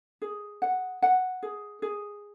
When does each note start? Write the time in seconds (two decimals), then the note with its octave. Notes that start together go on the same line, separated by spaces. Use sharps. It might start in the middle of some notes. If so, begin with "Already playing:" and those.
0.22 G#4
0.62 F#5
1.02 F#5
1.43 G#4
1.82 G#4